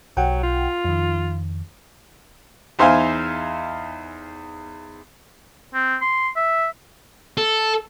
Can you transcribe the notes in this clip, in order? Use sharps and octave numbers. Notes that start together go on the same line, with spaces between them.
B1 F#3 F#5 G5
F4
F2 D#3
E2 D#4 C5 E5 F5 G#5
C4
C6
E5
A4